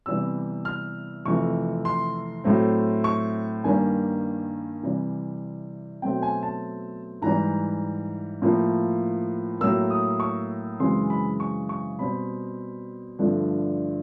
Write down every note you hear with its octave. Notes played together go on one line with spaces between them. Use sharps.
C3 E3 G3 B3 E6
F6
F2 C3 E3 A3 C#6
C6
A2 F#3 A3 C4
C#6
G2 D#3 G3 A#3 G#5
C3 E3 G3
B2 F#3 A3 C4 G5
G#5
A5
G#2 E3 G3 A#5
A2 F3 A#3
A2 F#3 A#3 E6
D#6
C#6
F#2 C#3 E3 G#3 C4 C6
B5
C#6
C#6
B2 G3 C4 B5
G2 D3 F3 A3